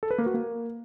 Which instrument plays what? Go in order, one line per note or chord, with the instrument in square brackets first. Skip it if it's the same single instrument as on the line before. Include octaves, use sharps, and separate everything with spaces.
[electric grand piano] A4
B4
A#3
F#4
A#3